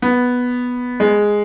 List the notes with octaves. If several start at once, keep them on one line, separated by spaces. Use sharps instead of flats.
B3
G#3